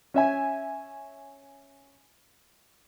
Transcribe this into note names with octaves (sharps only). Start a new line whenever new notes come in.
C#4 E5 G#5